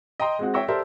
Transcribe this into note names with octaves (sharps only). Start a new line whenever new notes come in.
D#5 G5 A#5 C6
G#3 C4 F#4
C#5 E5 G5 C#6 E6 A#6
G4 A4 A#4 C5 D5 E5